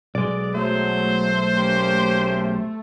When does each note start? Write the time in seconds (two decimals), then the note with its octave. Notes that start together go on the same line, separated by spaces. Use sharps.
0.15 B1 G#3 D5
0.55 F#3 A3 C5
1.54 A#3 C#4 G4